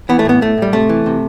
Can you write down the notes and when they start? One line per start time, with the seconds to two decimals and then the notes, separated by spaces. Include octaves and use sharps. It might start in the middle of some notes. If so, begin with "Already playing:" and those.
0.09 E3 B3
0.19 A3
0.25 A2 B3
0.41 A2 A3
0.57 A2 G3
0.73 C3 A3
0.89 E3
1.06 C3